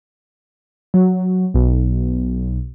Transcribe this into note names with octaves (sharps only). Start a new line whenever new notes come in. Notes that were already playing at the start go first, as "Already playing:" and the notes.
F#3
B1